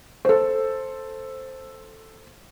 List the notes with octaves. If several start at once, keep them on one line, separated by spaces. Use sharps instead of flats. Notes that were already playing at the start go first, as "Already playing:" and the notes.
A4 C5